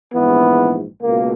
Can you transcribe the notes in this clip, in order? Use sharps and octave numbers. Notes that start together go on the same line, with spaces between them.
A#1 G#2 E3 B3
C#2 B2 A#3